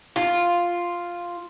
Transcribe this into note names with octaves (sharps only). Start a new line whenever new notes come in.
F4